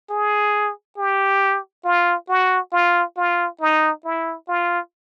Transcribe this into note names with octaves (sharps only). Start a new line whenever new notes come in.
G#4
G4
F4
F#4
F4
F4
D#4
E4
F4